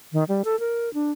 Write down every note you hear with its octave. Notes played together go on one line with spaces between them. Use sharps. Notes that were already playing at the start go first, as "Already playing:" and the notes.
D#3
G3
A4
A#4
D4